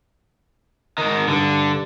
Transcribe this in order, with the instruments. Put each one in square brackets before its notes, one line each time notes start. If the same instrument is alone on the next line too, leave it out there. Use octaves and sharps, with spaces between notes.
[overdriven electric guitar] G#2 D#3
[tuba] G2 [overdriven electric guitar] D3